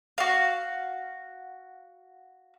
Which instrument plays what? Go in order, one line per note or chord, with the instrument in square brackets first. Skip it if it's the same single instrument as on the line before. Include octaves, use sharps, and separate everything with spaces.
[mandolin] F#4 F5